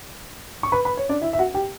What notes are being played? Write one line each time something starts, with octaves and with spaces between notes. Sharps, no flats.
C#6
B4 B5
B4 B5
C#5
D4 D5
E4 E5
E5
F#4 F#5
G4 G5